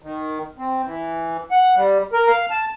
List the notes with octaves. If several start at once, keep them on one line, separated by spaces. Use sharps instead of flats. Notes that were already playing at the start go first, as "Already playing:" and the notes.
D#3
C4
E3
F#5
G3
A#4
F5
A5